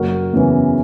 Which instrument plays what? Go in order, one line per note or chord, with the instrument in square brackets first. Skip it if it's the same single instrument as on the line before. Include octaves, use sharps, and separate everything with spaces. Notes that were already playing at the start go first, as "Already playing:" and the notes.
Already playing: [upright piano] F#1 F#4 A#4
E2 C#3 E3